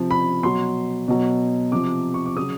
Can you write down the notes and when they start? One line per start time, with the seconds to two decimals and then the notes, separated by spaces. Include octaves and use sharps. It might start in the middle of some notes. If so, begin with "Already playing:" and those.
Already playing: C3 F3
0.11 B5
0.43 B2 F#3 C6
1.08 B2 F#3
1.72 C3 F3 D6
2.14 C#6
2.26 D6
2.36 C#3 F#3 D#6